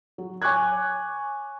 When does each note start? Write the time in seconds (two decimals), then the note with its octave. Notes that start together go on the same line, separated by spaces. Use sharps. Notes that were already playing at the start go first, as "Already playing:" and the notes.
0.18 F#3
0.42 C#5 G#5 C#6 D6 F#6 G#6